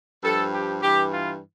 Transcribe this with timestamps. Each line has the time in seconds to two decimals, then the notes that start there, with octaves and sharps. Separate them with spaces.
0.22 G2 F3 A4
0.53 G4
0.82 G2 E3 G4
1.12 F4